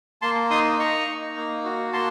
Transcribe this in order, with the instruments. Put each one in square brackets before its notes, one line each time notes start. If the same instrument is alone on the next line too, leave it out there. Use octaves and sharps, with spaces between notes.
[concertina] A#3 A5 C6
D#4 C6 D#6
D#4 A#5 C#6
D#4
A#3
F#4
A#3 A5 C6